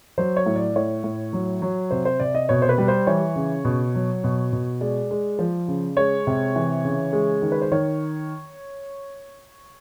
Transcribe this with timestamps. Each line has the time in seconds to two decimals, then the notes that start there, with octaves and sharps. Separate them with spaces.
0.18 F#3 C5
0.37 C#5
0.46 A2
0.56 D5
0.76 A2 C#5
1.04 A2
1.33 F#3
1.62 F#3
1.91 C3 C5
2.05 C5
2.20 C3 D5
2.35 D#5
2.49 B2 C#5
2.62 C5
2.69 B4
2.78 G3
2.88 C5
3.07 E3 C#5
3.36 C#3
3.65 B2
3.95 F#3
4.24 B2
4.53 B2
4.81 G#3 D5
5.11 G#3
5.39 F3
5.68 C#3
5.97 G#3 C#5
6.27 C3
6.56 E3
6.84 C#3
7.13 G#3
7.42 D#3
7.52 B4
7.62 C5
7.72 D#3 C#5